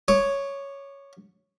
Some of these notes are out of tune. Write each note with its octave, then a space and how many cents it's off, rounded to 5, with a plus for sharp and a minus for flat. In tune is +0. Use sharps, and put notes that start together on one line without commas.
C#5 +0 D6 +35